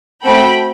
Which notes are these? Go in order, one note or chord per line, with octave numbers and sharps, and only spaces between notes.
A3 C4 F#4 A4 G5 B5